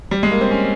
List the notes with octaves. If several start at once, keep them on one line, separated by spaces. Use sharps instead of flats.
G3
G#3
A#3
C4
C#4